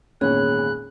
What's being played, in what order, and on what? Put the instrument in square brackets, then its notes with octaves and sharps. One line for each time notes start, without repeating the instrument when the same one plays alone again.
[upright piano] G#1 E2 A#2 [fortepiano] C#4 [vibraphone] G#4 B5 [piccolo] F#6